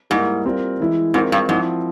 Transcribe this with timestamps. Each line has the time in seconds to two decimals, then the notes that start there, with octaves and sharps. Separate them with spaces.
0.10 G#2 G3 A#3 E4 A#4
0.45 G3 C4 F4 A#4
0.80 E3 G#3 E4
1.14 G#2 G#3 C4 F4 A#4
1.32 G2
1.49 G#2 F3 C4 E4